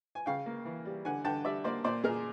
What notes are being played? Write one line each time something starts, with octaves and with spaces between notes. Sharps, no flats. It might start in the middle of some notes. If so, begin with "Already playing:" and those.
G#5
C#3 F5 G5
A#3
E3
G3
D3 F#5 G#5
D3 G5 A5
G3 D5 E5
A#3 C5 D5
A#2 C5 D5
A#2 G#4 A#4